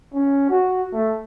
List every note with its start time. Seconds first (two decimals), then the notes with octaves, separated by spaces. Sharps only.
0.13 C#4
0.49 F#4
0.93 A3